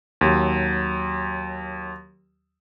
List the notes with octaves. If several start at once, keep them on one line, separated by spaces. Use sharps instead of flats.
D#2 F#3